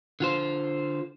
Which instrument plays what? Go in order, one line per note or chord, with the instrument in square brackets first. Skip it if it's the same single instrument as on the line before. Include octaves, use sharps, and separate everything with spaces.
[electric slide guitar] D3 F4 C5